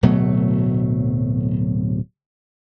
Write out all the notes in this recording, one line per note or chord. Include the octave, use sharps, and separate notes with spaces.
D1 B2 F#3 A3